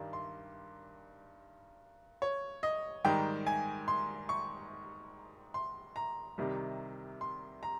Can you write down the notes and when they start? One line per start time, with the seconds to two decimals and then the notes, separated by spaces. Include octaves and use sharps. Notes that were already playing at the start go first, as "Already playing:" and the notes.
Already playing: G2 D#3 G3
0.13 C6
2.22 C#5
2.63 D#5
3.05 G#2 D#3 G3 G5
3.47 G#5
3.88 C6
4.29 C#6
5.54 C6
5.96 A#5
6.38 C2 C3 D#3 G3
7.21 C6
7.63 A#5